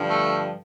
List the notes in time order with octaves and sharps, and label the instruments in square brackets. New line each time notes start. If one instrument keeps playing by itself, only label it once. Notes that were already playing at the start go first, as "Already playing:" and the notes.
Already playing: [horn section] G2 D3 F3
A3